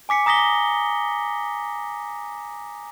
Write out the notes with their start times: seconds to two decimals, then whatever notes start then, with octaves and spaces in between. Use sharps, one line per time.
0.09 G#5 D6 B6 C#7
0.26 A#5 D#6 A#6 B6 G7